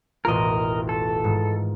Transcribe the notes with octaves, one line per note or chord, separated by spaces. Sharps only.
E1 A1 F4 A#4 D#5
A4
G#2 D#3